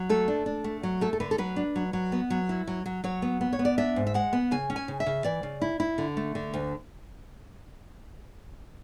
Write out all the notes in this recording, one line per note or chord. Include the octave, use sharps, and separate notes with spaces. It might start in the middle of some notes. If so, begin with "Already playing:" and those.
Already playing: F#3
A3 A4
D4
D4
A3
F#3
A3 A4
A4
D3 B4
A4
F#3 B4
D4
F#3
F#3
B3
F#3
E4
F#3
F#3
F#3 C#5
B3
B3
C#5
B3
D5
D4 E5
G#2
E5
G#3 F#5
B3
C#3 G#5
C#4
G#5
C#3
E5
C#3
E3 D5
C#3
E4
E4
D3
A3
D3
D2